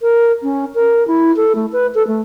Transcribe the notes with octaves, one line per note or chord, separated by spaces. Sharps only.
A#4
C#4
A#4
E4
A4
A3
B4
A4
A3